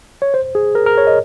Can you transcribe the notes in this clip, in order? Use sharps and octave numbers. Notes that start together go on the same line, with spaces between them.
C#5
C5
G#4
A#4
A#4
C#5
D#5